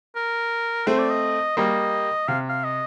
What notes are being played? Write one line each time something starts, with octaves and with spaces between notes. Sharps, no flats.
A#4
A3 C4 C5
D5
D#5
G3 A#3 D#5
C3 F5
F5
D#5